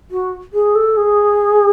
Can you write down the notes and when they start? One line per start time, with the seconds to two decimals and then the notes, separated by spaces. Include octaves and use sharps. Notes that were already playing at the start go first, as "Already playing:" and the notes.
0.11 F#4
0.53 G#4
0.75 A4
0.97 G#4